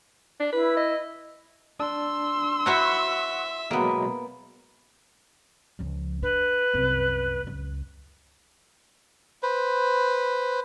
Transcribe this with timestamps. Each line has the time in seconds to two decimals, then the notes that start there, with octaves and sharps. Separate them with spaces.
0.40 D4
0.53 E4 B4
0.77 D#5
1.80 D4 C6 E6
2.66 E4 F#4 C5 E5 F#5 C#6
3.71 B2 F#3 G#3 A#3 B3
5.79 C#2 F3
6.22 D4 B4
6.74 C2 F#2
7.44 C#2 F#2
9.43 B4 C5